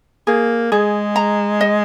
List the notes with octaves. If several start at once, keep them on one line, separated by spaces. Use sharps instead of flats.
A#3 G#4
G#3 G#4
A#5
D#5